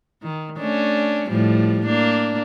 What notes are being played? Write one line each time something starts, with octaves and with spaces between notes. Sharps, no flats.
D#3
A3 C#4 D4
A2 F3 G3
A#3 D4